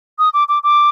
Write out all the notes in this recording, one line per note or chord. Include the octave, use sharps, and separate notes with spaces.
D#6
D6
D6
D6